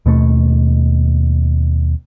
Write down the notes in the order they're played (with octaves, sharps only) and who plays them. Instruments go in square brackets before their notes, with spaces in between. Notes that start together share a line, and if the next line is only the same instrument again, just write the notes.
[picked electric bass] D#2 B2 A3